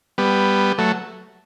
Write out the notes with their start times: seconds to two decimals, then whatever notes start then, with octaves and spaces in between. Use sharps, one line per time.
0.18 G3 B3
0.78 F#3 A3